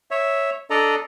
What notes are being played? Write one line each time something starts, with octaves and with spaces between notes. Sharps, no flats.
C#5 E5
D4 A4 D5 D#5 A#5